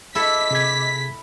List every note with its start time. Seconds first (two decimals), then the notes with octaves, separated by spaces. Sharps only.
0.15 E4 A4 D#5 E5 D6 B6
0.51 C3 G#4 G#6